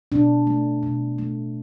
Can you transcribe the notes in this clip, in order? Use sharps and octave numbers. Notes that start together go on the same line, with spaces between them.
B2 D4
A3
B2
A3